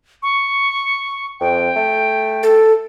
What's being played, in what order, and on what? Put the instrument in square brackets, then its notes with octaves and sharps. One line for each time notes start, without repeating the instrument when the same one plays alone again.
[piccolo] C#6
[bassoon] F2 [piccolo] G5
[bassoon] A3
[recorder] A4